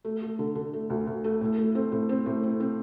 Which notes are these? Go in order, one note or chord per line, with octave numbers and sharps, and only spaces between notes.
A3
A3
D3
D3
A3
D2
D2
A3
A2
A3
C4
A2
C4
A2
C4
C4